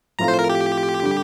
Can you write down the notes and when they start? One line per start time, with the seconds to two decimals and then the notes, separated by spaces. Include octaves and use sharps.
0.19 A2 F3 C4 F4 A4 A#5
0.28 C5
0.39 A#4
0.49 G4
1.02 D3 G3